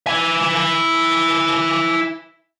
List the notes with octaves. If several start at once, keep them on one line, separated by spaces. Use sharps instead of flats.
E4 G#5